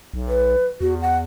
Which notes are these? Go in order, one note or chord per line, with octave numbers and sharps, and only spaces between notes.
B1
B4
E2 F#4
F#5